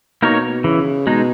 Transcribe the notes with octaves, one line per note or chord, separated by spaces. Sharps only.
B2 A#3 D#4 A#4 C#5
C#3 E3
B2 G#3 D#4